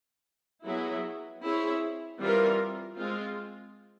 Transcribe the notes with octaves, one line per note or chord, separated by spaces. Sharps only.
F#3 B3 E4 G#4
C4 E4 G#4 C#5
E3 G3 C4 F4 A#4
G#3 C4 F4